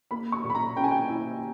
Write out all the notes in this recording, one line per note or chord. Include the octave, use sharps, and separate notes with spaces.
A#3 B5
C#6
A#2
B5
A#5
C#4 G5
G#5
G5
E4